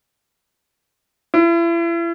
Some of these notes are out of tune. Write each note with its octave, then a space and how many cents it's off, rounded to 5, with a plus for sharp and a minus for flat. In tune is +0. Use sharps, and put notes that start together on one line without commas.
E4 +35